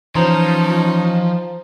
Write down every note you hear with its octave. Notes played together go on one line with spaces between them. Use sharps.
E3 F3 C#4 D#4 C5 A#5 C6